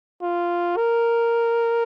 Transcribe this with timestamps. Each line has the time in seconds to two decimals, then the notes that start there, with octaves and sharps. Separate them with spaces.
0.22 F4
0.77 A#4